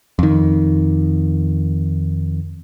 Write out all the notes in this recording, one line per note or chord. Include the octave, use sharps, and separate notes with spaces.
F2 D#3